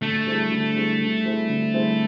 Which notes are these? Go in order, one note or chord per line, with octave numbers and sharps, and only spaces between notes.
D3 A3
G3 C4 E4 G#4
D3
G3 C4 E4 G#4
D3
G3 C4 E4 G#4
D3
G3 C4 E4 G#4